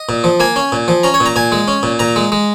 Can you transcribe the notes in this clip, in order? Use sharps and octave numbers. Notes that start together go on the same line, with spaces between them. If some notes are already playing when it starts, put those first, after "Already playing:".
Already playing: D#5
A#2
F3
A#3 G#5
C#4
A#2
F3
C#4 A#5
C#5
A#2
A#5
A#2 G#5
G#3
C#4
A#2
A#2 A#5
G#3
G#3